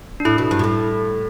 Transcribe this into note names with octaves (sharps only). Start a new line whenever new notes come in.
D4
A2 E4
B2
G2
B2
A2